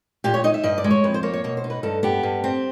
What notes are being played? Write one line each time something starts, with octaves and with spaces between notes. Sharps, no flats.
A#2 G4
C#5
D#4 D#5
E5
G2 D#5
D5
G#3
C#5
F2 B4
C5
A#3 C#5
C#5
B2 C#5
C5
D#4
B4
G2 A4
B3 G4
G2
C4